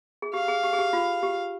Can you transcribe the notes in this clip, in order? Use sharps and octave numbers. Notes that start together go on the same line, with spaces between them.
G#4
G4 F5
G#4
G4
G#4
G4
F4
G4